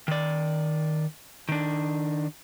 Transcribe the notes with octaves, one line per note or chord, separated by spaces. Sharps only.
D#3 D5
D#3 D4